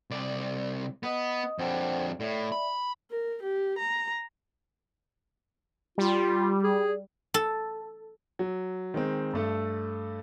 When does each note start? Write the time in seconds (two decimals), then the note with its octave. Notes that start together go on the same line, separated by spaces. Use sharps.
0.10 C2 D5
1.03 B3 D#5 D#6
1.59 F2 D4 C5 F#5 G5
2.20 A2 D5 E5
2.52 B5
3.11 A#4
3.43 G4
3.78 A#5
5.98 G3 F4
6.63 G#4
7.34 A4
8.39 F#3
8.94 D#3 G#3 C4
9.33 G2 A3 A4